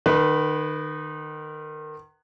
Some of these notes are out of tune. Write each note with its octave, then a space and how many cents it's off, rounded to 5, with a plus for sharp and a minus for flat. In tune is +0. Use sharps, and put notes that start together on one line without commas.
D#3 -30 B4 +0